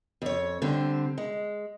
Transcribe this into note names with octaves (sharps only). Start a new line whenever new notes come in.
F2 C#5
D3 G3 C4
G#3